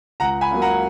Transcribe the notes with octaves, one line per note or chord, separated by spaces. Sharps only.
C#2 F#5 A#5
G#5 B5
C#3 F#3 A#3
F#5 A#5